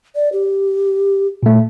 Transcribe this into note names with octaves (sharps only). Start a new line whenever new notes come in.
D5
G4
A#2 A3